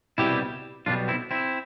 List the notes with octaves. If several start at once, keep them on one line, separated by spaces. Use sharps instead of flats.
C2 B2 G3 E4 G4
B1 B2 G3 D4 F4
C4 E4
C4 E4